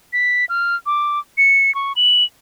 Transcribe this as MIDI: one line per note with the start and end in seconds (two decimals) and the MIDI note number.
0.13 0.45 95
0.49 0.76 89
0.86 1.19 86
1.38 1.73 97
1.75 1.93 85
1.96 2.24 102